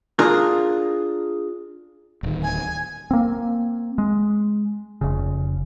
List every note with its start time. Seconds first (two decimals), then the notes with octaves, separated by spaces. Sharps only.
0.19 D4 F4 G#4 A#4
2.23 D1 D#3
2.43 G#5
3.11 A#3 C4
3.98 G#3
5.01 F1 C#3